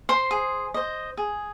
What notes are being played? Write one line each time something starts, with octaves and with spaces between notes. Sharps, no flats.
C5 C6
G#4
C5 D#5
G#4